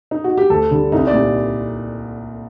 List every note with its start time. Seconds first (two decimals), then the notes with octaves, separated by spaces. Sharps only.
0.11 D#4
0.24 F#4
0.37 G4
0.50 D2 A4
0.71 D3 G3
0.92 C2 D#4
1.07 D5
1.14 A#2 G3